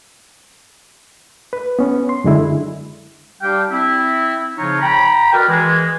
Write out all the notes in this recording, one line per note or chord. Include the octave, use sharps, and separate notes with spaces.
B4
B3 C#4
C6
F#2 D3 G#3 E4
G3 D4 G4 F5 G5
C4 E4
C#3 F3 D#4 F4 C#5
G5 A#5 B5
F#4 A#4 B4 D5 D#5 G5
E3 G#3